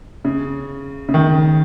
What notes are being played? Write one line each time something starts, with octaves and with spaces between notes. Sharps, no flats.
C#3
C#3
D#3